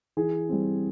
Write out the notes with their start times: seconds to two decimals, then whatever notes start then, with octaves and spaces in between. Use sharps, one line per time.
0.17 E3 G#4
0.49 G3 C4